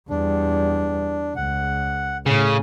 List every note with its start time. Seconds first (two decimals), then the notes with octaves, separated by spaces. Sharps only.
0.10 E2 G3 D4
1.36 C#2 F#5
2.26 A2 C#3